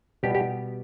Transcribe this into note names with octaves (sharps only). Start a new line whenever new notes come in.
B2 G3 B3 G4
G4